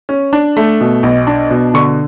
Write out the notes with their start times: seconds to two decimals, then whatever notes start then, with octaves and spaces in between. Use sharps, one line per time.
0.09 C#4
0.33 D4
0.57 A3
0.81 B2
1.03 B1
1.27 D4
1.51 B2
1.74 D3 C#6